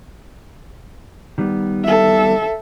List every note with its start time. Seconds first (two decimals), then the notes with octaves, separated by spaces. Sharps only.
1.38 D#3 G3 B3
1.84 A4 E5